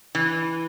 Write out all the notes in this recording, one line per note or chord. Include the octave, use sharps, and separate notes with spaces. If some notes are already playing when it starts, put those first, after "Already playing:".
E3